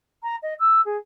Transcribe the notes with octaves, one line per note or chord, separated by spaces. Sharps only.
A#5
D#5
E6
G#4